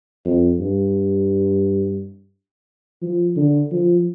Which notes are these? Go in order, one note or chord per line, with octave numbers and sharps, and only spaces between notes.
F2
G2
F3
D3
F3